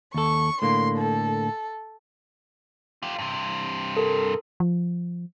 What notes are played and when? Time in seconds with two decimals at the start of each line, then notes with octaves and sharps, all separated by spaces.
0.14 D#2 A4 C#6
0.62 A2 D3 A#3 C6
0.98 A4
3.03 F4 G4
3.18 G2 C3
3.97 A4 A#4
4.60 F3